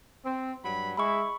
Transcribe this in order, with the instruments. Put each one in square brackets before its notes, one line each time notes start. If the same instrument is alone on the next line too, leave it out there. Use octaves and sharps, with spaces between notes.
[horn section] C4
G2 F#3 B5
[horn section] G#3 E4 [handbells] B5 C#6